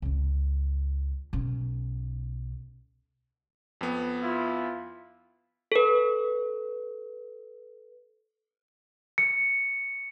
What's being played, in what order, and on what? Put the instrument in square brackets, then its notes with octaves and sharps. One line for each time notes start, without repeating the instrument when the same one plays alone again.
[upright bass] C#2 C#3
B1 C#4
[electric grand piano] F2 B3
[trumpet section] E4 F4
[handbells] A4 B4
[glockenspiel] C#7